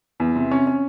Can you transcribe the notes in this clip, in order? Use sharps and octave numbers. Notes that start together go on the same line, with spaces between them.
E2 B3
C3
C4 C#4
C#4